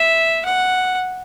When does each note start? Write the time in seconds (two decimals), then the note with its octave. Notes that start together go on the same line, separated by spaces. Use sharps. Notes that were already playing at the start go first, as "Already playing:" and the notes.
Already playing: E5
0.45 F#5